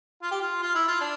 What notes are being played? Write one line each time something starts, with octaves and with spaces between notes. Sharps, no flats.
F4
G4
F4
F4
E4
F4
D4